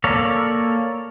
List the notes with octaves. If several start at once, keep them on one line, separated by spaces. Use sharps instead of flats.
A#3 A4 A#4 C#5 D5